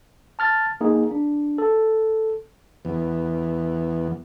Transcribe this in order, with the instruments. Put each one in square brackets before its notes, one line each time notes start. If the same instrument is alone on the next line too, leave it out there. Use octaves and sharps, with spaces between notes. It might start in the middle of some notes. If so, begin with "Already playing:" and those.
[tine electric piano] A5 F6 A6
A#3 D#4 G#4
D4
A4
[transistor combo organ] E2